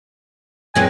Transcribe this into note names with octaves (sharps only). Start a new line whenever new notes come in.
C#2 F#2 G#3 C4 G#5